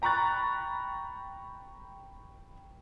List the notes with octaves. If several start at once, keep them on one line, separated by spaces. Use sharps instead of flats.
G5 A#5 B5 C#6 F#6 A6